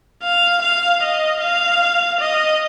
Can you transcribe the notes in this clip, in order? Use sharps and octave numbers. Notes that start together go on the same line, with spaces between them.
F5
F5
D#5
F5
D#5